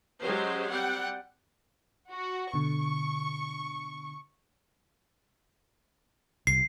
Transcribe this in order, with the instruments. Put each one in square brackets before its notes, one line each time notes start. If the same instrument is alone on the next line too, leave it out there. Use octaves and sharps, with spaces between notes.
[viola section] F#3 G#3 C#4 G4 C5
G3 C4 F#5 G5
[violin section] F#4
[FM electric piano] B2 D3 [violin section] C#6
[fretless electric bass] C2 [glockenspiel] C7